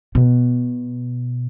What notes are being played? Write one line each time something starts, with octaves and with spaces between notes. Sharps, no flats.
B2